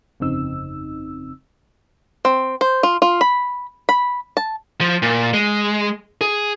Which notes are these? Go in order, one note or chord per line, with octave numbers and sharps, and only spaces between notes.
G1 F2 C#3 C4 D#4 E6
C4
C5
F4
F4
B5
B5
A5
F3
A#2
G#3
G#4